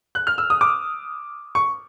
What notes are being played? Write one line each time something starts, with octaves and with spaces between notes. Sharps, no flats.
F#6
F6
E6
D#6
D6
C#6